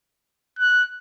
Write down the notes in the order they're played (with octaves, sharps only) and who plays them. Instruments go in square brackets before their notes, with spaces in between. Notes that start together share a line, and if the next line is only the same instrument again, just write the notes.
[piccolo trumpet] F#6